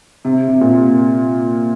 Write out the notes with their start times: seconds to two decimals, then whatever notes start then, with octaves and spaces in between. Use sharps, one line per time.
0.25 C3
0.48 C3
0.61 A#2